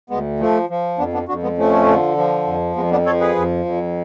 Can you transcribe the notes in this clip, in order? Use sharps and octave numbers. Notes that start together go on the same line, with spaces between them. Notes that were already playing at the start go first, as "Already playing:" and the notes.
D2 G#3 B3
F3 A3
F3
F2 B3 D4
B3 D4
F2 D4 F#4
G#3 B3
F3 A3 C#4
D3
F3
F2
F2 G#3 B3
B3 D4
F3 A4 C#5
G#4 B4
F2
F2